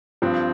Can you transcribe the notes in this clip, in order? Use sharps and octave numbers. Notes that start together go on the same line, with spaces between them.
G2 F3 C4